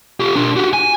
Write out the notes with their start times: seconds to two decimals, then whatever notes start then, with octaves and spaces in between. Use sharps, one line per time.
0.20 F4 G4
0.36 D4 A#4
0.56 F#4 G4
0.73 G#5